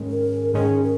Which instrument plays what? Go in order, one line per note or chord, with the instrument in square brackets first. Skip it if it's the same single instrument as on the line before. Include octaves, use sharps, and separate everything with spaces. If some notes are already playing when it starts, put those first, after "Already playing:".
Already playing: [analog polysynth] G#2 D#3 G#3 C#4
[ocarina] A#4
[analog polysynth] G#2 D#3 G#3 C#4 [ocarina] G#4
[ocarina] A#4